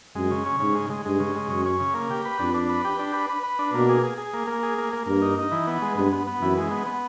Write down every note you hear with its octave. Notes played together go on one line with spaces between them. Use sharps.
F#2 G#3
C#3
C#4
G#2 C#3
G#3
G#3
G2 G#3
C#3
G#3
F#2 C#4
C#4
C#3
A#3
G4
B4
F2 D4
D4
B4
G4
D4
B4
B4
B4
D4
B2 A#3
G#4
G#4
G#4
A#3
A#3
G#4
A#3
A#3
G2 A#3
D#4
D#4
E3
B3
G#3
G2 B3
B3
B3
F#2 E3
G#3
B3
B3